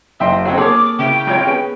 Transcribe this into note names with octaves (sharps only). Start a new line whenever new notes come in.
F#1 C#3 D#5 E5 G5 C6
F#3 C4 C#4
A#3 G#4 A4 C#5 D6
C#3 C#4 E4 G5
G#1 F4 C#5
B3 C#4 G#4